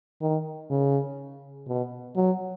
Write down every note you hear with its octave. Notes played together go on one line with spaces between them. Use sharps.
D#3
C#3
B2
F#3